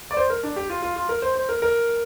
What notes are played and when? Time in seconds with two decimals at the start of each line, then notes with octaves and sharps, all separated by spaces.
0.11 D5
0.17 C5
0.30 A#4
0.43 D4
0.56 G4
0.70 F4
0.82 F4
0.96 F4
1.09 A#4
1.22 C5
1.36 C5
1.49 A#4
1.62 A#4